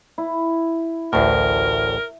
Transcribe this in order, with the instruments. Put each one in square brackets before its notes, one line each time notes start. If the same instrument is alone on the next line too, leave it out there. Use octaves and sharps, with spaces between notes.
[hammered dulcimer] E4
[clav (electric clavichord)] A1 D2 A2 [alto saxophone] A#4